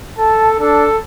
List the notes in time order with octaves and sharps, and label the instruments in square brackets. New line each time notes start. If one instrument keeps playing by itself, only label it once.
[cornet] A4 [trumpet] A5
[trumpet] D4 [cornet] A4